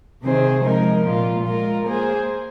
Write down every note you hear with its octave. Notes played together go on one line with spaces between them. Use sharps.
C3 D#3 C4 G#4 C5
F3 G#3 D#4 A#4
A#2 A#3 F4
G#3 F4 A#4
A#3 G#4 C5